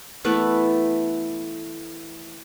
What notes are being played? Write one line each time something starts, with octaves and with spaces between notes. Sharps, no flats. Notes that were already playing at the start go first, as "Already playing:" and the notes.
E3 A3 B3 B4